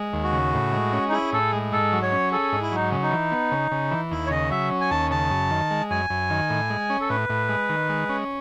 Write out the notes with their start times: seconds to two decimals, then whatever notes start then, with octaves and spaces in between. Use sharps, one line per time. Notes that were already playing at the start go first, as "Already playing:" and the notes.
Already playing: G#3
0.13 D#2
0.24 F#4
0.33 C#3
0.53 A2
0.73 G#3
0.93 C#4
1.09 D#4
1.12 E4 G#4
1.33 A2 A4
1.53 G#3
1.72 G#2 A4
1.92 F#3
2.02 C#5
2.12 C#4
2.32 G#4 A4
2.52 G#2
2.62 E4
2.72 F#3 D#4
2.92 C#3
3.02 D#4
3.11 E3
3.32 B3
3.51 C#3
3.72 C#3
3.91 E3
4.11 D#2 E4
4.26 C#5
4.31 C#3 D#5
4.51 F#3 E5
4.71 C#4
4.81 G#5
4.91 D#2 A5
5.11 C#3 A5
5.31 F#2
5.51 D#3
5.71 G#3
5.90 F#2 G#5
6.10 F#2
6.30 D#3
6.50 A2
6.70 G#3
6.90 C#4
7.01 A4
7.09 A2 B4
7.29 A2
7.49 G#3
7.69 D#3
7.89 G#3
8.09 C#4